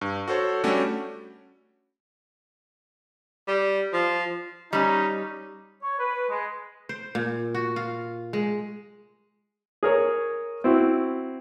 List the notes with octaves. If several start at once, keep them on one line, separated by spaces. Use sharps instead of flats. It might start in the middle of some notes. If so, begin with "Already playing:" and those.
G2
F#4 A4 C5 C#5
G3 A3 C#4 D4 F#4 G4
G3
F3
G3 C#4 D#4
C#5
B4
G#3
C5
A#2
F#4
F4
G#3
G#4 A#4 C#5
C4 E4 F#4